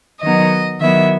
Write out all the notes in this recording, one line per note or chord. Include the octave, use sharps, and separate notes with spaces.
D#3 F#3 B3 D#4 D#5
D#3 F#3 B3 E4 E5